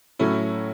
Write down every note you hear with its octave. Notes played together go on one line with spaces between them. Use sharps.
A2 F#3 A3 C#4 E4